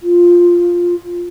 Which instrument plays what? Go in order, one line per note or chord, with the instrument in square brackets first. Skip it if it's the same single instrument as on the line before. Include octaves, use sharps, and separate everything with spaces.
[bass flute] F4